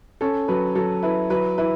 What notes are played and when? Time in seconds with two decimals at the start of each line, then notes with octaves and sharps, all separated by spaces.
0.21 C#4 A4
0.48 F#3 B4
0.75 F#3 A4
1.03 E4 B4
1.30 F#3 B4
1.58 E4 B4